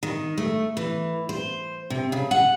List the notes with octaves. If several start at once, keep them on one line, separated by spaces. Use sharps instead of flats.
D#3
A3
E3
C5
C3
C#3
F#5